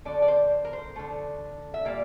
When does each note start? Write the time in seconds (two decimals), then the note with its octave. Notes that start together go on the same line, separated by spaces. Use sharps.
0.05 D3 A3 D5
0.22 D5
0.28 C5
0.65 A#4
0.73 C5
0.96 D3 A3
1.74 E5
1.85 A#2 G3 A#3 D5